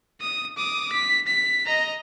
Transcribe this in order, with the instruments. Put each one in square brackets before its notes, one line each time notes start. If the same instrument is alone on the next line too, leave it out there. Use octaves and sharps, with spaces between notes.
[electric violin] D#6
D6 D#6
B6
B6
D#5 A#5